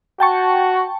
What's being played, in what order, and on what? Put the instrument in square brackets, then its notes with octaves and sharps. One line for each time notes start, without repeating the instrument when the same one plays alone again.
[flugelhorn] F#4 [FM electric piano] G5 A5 C#6